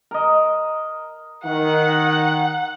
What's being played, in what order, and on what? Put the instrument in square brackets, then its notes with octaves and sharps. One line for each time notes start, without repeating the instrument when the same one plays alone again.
[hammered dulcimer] A#4 D#5
[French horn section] D#3 [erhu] F#5